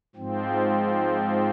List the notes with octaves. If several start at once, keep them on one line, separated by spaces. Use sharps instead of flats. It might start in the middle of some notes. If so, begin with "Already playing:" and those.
G#2 F3 C4